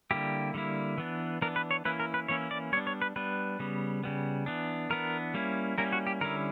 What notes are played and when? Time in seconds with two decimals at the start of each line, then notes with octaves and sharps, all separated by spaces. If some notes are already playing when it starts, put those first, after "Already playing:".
0.11 D3 G3 A#3 E4 G4
0.54 D3 G3 A#3 E4
0.98 E3 B3 D4
1.42 E3 B3 D4 A#4
1.56 B4
1.71 C#5
1.85 E3 A#3 C#4 E4 B4
2.00 A#4
2.14 B4
2.28 E3 A#3 C#4 E4 C#5
2.51 D5
2.73 G3 B3 D4 C#5
2.87 C#5
3.02 B4
3.16 G3 B3 D4 B4
3.59 C#3 G3 B3
4.03 C#3 G3 B3
4.46 E3 B3 D4
4.90 E3 B3 D4 A#4
5.34 G3 A#3 C#4 E4
5.78 G3 A#3 C#4 E4 A#4
5.93 F#4
6.07 G4
6.21 D3 G3 C#4 E4 A#4